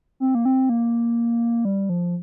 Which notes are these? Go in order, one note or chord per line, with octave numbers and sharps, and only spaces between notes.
C4
A#3
C4
A#3
G3
F3